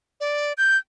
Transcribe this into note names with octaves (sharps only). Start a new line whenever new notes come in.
D5
G6